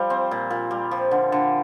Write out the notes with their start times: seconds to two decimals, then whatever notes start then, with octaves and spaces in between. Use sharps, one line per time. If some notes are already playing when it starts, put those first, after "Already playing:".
Already playing: F3 G3
0.10 C4
0.31 A#2
0.50 A#2
0.71 G3
0.91 F3
1.11 D3
1.32 D3